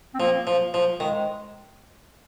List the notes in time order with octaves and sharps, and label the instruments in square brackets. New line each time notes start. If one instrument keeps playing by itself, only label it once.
[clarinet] C4
[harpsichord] F3 [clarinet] A#3
[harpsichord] F3
F3
[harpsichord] D#3 [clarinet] G#3